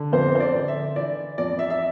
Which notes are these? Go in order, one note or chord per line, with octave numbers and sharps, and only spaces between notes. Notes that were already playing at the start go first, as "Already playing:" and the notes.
Already playing: D3
F2 C5
C5
D5
D3
E5
E3 D5
F2 D5
E5
E5